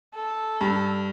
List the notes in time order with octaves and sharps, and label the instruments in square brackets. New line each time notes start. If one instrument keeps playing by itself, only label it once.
[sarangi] A4
[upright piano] G2